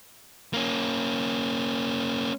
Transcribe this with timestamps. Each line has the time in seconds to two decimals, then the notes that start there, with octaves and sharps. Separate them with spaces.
0.53 A#3 C#4